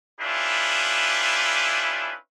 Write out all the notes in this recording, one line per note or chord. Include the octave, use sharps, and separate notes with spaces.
C#4 D4 E4 F4 G4 B4